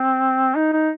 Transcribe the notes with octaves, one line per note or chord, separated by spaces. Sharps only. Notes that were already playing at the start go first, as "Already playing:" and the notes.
Already playing: C4
D#4
D#4